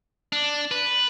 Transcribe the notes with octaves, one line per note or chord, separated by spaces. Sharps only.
D4
B4